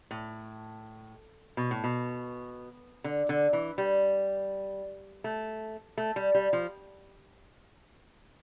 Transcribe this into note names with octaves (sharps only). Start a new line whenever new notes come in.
A2
B2
A2
B2
D3
D3
E3
G3
A3
A3
G3
G3
F3